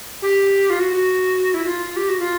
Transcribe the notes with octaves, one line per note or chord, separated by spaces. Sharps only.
G4
F4
F#4
F#4
E4
F#4
F4
G4
F#4
F4